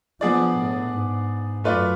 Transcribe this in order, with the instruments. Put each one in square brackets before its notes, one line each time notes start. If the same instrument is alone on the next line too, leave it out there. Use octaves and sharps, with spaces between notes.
[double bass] F3 [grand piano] B3 D4 G#4 D5
[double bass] A2
G#2
[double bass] F#2 [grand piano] A3 F4 B4 D5